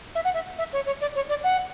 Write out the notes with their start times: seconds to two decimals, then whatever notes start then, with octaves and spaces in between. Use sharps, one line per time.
0.15 E5
0.25 F#5
0.34 E5
0.58 E5
0.73 C#5
0.86 C#5
1.01 D5
1.16 C#5
1.29 D5
1.44 F#5